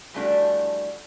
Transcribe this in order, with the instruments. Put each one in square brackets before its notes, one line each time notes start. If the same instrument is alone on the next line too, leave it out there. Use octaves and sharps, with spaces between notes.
[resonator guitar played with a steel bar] E3 F3 G3 A3 D4 F#4